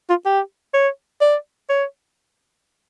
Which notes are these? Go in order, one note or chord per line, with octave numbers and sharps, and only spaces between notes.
F4
G4
C#5
D5
C#5